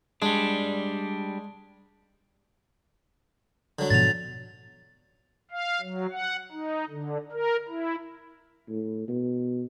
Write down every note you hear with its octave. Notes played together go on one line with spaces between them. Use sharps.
G3 G#3 D4
D3 F#3
G#2 B2 F3 A6 F7
F5
F#3
F#5
D#4
D3
A#4
E4
A2
B2